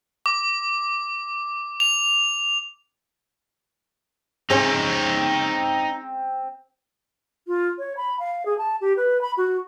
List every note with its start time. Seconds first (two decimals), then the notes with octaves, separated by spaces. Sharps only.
0.26 D6
1.80 F7
4.50 G#3 C4 C#4 D#4 C#5
7.47 F4
7.79 C#5
7.97 B5
8.19 F5
8.46 G#4
8.58 A5
8.81 G4
8.97 B4
9.21 B5
9.37 F#4